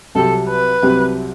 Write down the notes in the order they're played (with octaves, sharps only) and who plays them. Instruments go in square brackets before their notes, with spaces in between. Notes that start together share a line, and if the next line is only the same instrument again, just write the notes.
[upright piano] C2 C3 F#3 C4 G4 [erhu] A4
[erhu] B4
[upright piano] C2 C3 F#3 C4 G4